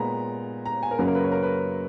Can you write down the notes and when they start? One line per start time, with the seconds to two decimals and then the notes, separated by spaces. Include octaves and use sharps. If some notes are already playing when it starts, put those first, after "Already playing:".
Already playing: A#2 G#3 B3 A#5 B5
0.65 A#5
0.83 G#5
0.91 A#4
0.98 F#2 C#3 F#3 A#3 B4
1.07 A#4
1.15 B4
1.24 C#5
1.32 A#4
1.43 B4